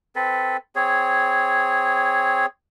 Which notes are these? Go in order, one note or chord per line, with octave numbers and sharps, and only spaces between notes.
C4 A4 B4
C4 G#4 C#5